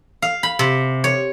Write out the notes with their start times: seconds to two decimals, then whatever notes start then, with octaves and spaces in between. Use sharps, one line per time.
0.22 F5
0.43 B5
0.59 C3
1.04 C#5